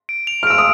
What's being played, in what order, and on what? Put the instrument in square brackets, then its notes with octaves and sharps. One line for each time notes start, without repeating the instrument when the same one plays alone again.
[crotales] D7
F7
[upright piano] F6
[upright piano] E6 [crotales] D7
[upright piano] D#6